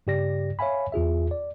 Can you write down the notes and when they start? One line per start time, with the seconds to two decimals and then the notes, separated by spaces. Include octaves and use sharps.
0.07 G2 C#3 G4 D5 A#6
0.59 C#5 E5 F5 G#5 B5
0.92 E2 F4 G#4 E5
1.31 D5